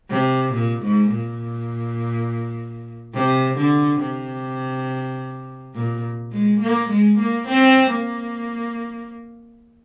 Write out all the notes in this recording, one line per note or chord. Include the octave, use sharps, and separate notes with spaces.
C3
A#2
G#2
A#2
C3
D3
C3
A#2
G#3
A#3
G#3
A#3
C4
A#3